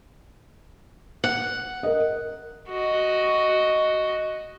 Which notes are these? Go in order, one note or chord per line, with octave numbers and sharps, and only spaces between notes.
F#5
A#4 D#5
F#4 D#5